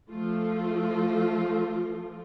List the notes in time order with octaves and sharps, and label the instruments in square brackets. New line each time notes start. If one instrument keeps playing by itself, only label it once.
[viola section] F3 A3 F4